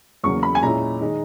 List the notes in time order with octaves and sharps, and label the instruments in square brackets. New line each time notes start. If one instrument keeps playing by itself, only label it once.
[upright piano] E2 C#3 F#3 A#3 C#6
B5
G#5
A#2 G#3 C#4 E4 A#5
D#3 G#3 D#4